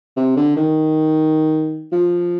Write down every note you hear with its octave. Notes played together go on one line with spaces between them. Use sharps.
C3
D3
D#3
F3